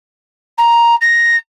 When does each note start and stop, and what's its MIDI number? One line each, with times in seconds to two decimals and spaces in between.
0.58 0.95 82
1.01 1.35 94